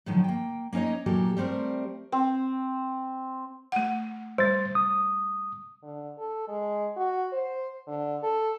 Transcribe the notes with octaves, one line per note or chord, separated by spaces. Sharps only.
A2 D3 D#3 F3 F#3
A#3 G5
A#3 C#4 D#4 C#5 D#5
A#2 E3 F#3 A#3 G4 A4
G3 A3 C4 A#4 C5
C4
A3 F#5
G3 C5 A6
D#6
D3
A4
G#3
F#4
C5
D3
A4